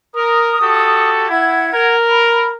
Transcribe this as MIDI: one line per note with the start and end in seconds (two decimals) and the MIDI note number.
0.15 0.56 70
0.15 1.10 87
0.61 1.27 66
0.61 1.27 67
0.61 1.27 69
1.29 1.71 64
1.29 1.92 78
1.29 1.92 92
1.73 2.57 70
2.07 2.48 83